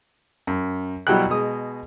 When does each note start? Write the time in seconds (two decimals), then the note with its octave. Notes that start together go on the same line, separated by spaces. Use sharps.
0.47 F#2
1.07 B2 F#3 G3 E4 G5 F#6
1.30 B2 G#3 D#6